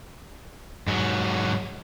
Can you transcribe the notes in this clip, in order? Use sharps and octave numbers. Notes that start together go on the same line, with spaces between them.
G#2 F#3